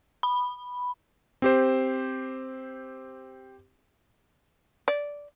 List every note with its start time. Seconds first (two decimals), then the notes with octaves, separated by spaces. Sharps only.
0.23 B5
1.42 C4 G4 C5
4.88 D5